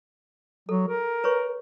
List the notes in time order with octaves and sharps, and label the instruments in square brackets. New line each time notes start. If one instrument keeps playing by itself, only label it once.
[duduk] F#3 [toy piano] A4
[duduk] A#4
[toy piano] B4 C#5 C#6